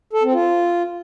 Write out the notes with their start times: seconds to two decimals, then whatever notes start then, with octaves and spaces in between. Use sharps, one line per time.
0.13 A4
0.23 C4
0.33 F4